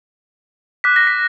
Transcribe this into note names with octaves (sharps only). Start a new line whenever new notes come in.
D6 F#6 B6
A#6
B6